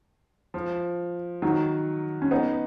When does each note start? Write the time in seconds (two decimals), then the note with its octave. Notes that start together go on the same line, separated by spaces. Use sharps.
0.54 F3
1.42 D#3 F#3
2.22 C#4
2.31 B3 D#4